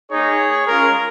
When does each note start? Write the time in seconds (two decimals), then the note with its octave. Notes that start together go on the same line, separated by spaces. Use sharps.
0.11 A#3 D#4 G#4 C#5
0.67 G#3 C#4 F4 A#4